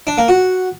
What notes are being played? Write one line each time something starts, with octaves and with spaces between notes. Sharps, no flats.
D4
A#3
F#4